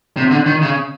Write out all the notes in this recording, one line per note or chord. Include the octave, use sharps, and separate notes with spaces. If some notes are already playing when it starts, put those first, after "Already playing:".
C3
D3
D#3
C#3